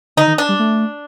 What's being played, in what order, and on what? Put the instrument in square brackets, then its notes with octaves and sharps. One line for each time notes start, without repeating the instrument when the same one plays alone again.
[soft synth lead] D3 [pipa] D#4
[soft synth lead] D#3
[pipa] D4
[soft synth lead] G3
A3